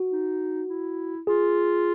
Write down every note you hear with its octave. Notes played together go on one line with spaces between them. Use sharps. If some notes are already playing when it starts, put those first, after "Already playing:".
Already playing: F#4
D#4
E4
F4 G#4